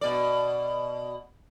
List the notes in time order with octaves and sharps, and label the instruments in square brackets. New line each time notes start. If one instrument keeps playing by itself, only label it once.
[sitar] B2 D5